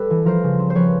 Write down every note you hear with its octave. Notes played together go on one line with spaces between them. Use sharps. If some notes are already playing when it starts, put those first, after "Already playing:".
Already playing: G3 G4 A4 B4
E3
F3 A#4 C5
C#3
C4
C5
F3 B4 C#5